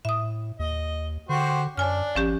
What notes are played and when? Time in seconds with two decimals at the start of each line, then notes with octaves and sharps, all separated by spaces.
0.05 A2 E5 D#6
0.59 D#2 D#5
1.29 D3 F#4 G4 C5
1.77 F#2 D4 C#5 G#5 F6
2.15 G#1 F3 C#4 G4